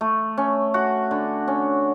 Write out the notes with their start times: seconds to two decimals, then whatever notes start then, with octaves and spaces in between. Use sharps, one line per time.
0.01 A3
0.37 C#4
0.74 F#4
1.11 D3
1.48 C#4